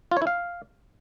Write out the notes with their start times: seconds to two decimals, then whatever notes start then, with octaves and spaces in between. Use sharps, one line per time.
0.11 F4
0.17 C#5
0.22 E4
0.27 F5